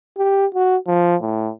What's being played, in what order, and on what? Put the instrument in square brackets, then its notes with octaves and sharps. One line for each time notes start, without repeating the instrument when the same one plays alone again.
[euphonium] G4
F#4
F3
A2